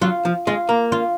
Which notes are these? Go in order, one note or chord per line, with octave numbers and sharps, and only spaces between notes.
F#3 F4
F3
G#3 F4
A#3
F4